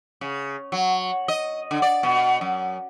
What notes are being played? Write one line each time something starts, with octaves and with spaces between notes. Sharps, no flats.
C#3
F#3
D#5
D3
D5
B2
F#2